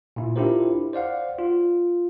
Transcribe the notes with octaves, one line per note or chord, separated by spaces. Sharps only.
A#2 E4
D4 E4 F4 G4 A#4 C5
C5 D5 F5 F#5
F4